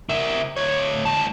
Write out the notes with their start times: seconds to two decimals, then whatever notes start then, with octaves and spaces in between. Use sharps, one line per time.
0.09 E4 A#4
0.57 D2 C#5
1.05 C#2 A5